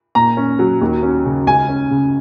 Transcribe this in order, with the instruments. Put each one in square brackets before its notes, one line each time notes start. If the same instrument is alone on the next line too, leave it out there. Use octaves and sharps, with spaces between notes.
[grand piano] A#2 A#5
C#4
F#3
D#2
C#4
C#3
C#2 G#5
C#4
C#3